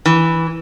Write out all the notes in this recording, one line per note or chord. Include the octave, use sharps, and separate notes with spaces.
E3